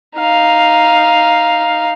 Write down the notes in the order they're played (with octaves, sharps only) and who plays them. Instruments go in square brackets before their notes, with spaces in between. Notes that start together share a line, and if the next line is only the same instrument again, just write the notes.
[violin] D#4 F5